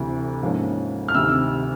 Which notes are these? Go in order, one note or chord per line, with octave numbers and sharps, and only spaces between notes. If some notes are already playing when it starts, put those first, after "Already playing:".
Already playing: D2 C3 E3
G#2 F3 A#3 C#4
F6
D2 C3 D#3 E6